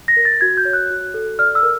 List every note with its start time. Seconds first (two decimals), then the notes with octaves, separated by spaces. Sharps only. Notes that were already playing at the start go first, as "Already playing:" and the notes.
0.08 A#6
0.17 A#4
0.25 A6
0.41 F#4 G#6
0.57 G6
0.65 C#5
0.73 F#6
0.90 F#4
1.14 A4
1.39 D5 F6
1.55 E6
1.63 A#4